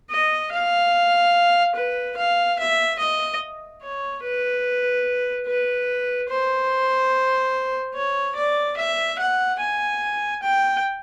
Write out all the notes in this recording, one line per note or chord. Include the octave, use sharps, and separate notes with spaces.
D#5
F5
B4
F5
E5
D#5
C#5
B4
B4
C5
C#5
D5
E5
F#5
G#5
G5